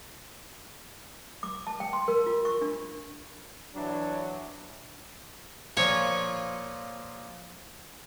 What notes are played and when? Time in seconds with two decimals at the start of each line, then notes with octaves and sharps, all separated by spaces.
1.43 D6
1.67 A5
1.80 G5
1.93 C6
2.08 A#4
2.27 F4
2.45 C#6
2.62 D4
3.75 E3 F#3 D4
5.77 A#2 F3 C#5